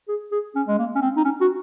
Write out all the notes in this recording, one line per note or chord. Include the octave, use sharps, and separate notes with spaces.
G#4
G#4
C#4
G#3
A#3
C#4
C4
D#4
C#4
F#4